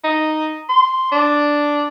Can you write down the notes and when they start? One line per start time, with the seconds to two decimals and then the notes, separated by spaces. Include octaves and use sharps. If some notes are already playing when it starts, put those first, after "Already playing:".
0.04 D#4
0.69 C6
1.12 D4